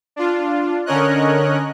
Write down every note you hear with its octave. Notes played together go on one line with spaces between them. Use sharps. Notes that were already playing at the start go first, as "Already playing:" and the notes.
D4 F4
D3 C#4 A#4 C#5 D#5 F#6